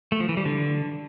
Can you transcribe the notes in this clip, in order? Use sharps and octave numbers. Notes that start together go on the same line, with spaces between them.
A3
F3
E3
G3
D3